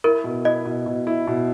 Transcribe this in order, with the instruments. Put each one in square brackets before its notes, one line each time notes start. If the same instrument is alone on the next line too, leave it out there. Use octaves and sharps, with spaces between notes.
[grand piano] E4 [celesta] A#4
[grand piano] B2
[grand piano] E4 [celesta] D#5
[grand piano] B2
B2
E4
B2